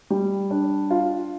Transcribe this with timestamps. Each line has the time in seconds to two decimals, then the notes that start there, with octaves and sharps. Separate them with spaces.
0.10 G3
0.51 D4
0.90 F4